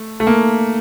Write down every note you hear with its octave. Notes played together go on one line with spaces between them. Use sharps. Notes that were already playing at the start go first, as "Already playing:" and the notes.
Already playing: A3
A3
A#3